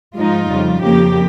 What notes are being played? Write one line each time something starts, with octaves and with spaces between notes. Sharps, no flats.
G#2 F3 G#3 D#4 F4
F2 C#3 G3
F2 C#3 F3 A#3 G4